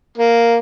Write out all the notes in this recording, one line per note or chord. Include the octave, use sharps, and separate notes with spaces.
A#3